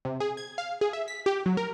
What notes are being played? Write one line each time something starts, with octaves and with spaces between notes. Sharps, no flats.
C3
G#4
G#6
F5
G#4
E5
B6
G4
F#3
A#4